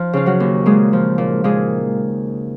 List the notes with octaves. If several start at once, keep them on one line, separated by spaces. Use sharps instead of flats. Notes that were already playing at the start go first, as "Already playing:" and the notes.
Already playing: F3 D#4
C#3 F4
F#3 F#4
D#2
A#2 G#3 G#4
F3
A#2
A#2 G#3 G#4